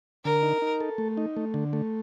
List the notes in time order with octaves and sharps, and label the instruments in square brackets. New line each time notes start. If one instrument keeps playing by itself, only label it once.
[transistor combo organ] D3 [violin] A#4
[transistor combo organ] D#4
D#4
A4
A3
D#4
A3
D3
A3